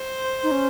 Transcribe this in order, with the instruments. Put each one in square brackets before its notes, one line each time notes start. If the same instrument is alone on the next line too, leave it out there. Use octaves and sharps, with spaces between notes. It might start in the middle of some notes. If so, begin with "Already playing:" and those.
Already playing: [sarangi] C5
[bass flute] D#4
C#4